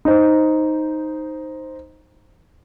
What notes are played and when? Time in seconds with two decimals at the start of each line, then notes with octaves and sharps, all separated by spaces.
0.05 D#4 C5